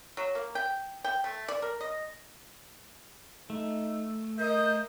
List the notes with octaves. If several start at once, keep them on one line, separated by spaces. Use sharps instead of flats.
F#3
A#3
G5
G5
A3
D5
A#4
D#5
A3 D#4
A#4 D#5 G6